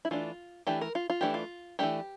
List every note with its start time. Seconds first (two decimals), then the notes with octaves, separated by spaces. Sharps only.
0.05 E4
0.11 E3 A3 D4 F4
0.67 E3 A3 D4 G4
0.81 A#4
0.95 F4
1.10 F4
1.21 E3 A3 D4 G4
1.34 F4
1.79 E3 A3 D4 G4